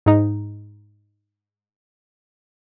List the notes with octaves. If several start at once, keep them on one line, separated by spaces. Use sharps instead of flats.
G#2 D#4